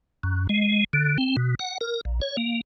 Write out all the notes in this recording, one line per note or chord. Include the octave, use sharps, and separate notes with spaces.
F#2
G#3
D3
C4
B2
F#5
A#4
A#1
C#5
A#3